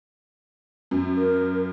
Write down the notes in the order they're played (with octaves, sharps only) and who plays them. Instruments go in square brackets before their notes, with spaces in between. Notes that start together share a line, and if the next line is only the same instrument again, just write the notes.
[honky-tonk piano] F#2
[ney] A#4